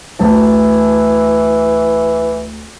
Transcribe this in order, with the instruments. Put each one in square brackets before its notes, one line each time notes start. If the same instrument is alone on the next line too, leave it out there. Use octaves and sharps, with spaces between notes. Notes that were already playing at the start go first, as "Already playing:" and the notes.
[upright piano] D2 A5 [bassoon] E3